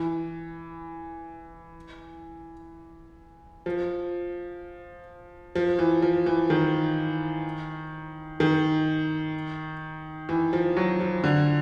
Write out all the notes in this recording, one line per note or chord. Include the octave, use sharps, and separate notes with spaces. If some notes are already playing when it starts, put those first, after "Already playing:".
Already playing: E3
F3
F3
E3
F3
E3
D#3
D#3
E3
F3
F#3
F3
D3